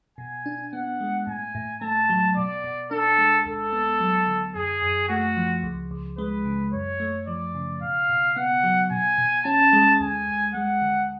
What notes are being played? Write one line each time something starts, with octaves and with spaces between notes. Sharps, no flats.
B2 G#5
D4
B3 F#5
G#3
A2 G#5
A2
A3 A5
F#3
B2 D5
B2
D4 A4
G#3
D2 A4
B3
F#3
D3
F#2 G#4
F#2
A3 F#4
F3
C#2
C#2
G#3 B4
C#3
F#2 C#5
A3
F3 D5
C#3
B2 F5
B2
B3 F#5
F#3
B2 G#5
B2
C#4 A5
G#3
D2 G#5
D2
G#3 F#5
D3